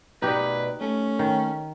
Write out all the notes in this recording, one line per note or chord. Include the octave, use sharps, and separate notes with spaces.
B2 D#4 G4 B4 D5
A3 C#4
D#3